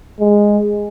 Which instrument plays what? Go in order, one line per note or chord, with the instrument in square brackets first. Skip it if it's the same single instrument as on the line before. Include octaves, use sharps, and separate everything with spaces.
[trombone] G#3